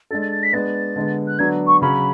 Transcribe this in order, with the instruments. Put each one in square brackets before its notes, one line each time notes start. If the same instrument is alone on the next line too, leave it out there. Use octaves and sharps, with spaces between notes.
[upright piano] G#3 D4 A4 [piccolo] A6
[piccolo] A6
A6
B6
[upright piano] G#3 B3 D4 [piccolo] A6
[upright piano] D3 G#3 B3
[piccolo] F#6
[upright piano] D3 F#3 B3 D4 [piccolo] G#6
[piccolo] C#6
[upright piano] C#3 F#3 C#4 [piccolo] B5